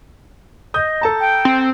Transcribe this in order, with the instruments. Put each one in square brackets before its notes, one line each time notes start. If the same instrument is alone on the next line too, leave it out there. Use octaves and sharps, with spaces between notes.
[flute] D#5 [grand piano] D#6 G6
[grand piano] A4 A5 A#5
[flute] G5
[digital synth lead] C4